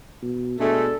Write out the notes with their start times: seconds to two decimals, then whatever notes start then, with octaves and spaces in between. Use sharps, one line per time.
0.22 B2
0.60 B2 G#3 A3 D4 A4